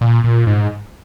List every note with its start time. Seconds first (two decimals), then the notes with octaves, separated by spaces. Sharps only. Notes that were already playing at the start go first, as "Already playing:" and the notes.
0.01 A#2
0.24 A#2
0.47 G#2